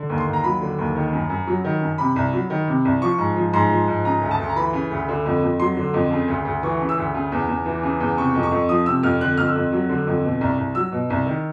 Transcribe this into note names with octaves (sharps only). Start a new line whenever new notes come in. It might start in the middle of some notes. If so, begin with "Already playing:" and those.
Already playing: D3
D#2
C6
D#2
A#5
F#3 B5
D3
D#2
D#3
F#2
F#2
F#3
D#3
F#2
C3 B5
C2
F#3
D#3
C3
C2
F3 C#6
G#2
F3
G#2 C6
F3
G#2
C#3 A#5
D2
A5
D2
A#5
E3 B5
C#3
D2
D3
F2
F2
F#3 C6
D3
F2
C#3
D2
D2
E3 C#6
C#3
E6
D2
C#3
E2
E2
E3
C#3
E2
C3 C#6
F2
C#6
F2
F3 D#6
C3 E6
F2 F6
D3 F#6
F2 F6
E6
F2
F#3
D3
F2
B2
C2
C2
F#3 E6
B2
C2
D#3